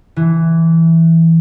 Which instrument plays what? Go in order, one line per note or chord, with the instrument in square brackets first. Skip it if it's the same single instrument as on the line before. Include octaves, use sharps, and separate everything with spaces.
[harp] E3